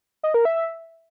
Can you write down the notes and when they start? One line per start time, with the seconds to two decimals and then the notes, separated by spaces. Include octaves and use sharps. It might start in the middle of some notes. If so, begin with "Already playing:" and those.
0.23 D#5
0.34 A#4
0.45 E5